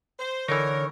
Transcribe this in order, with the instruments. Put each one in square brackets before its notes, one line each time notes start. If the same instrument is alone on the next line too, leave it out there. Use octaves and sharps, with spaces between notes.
[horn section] C5
[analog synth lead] D3 [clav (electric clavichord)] E3 D#4 [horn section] A#4 [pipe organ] C#5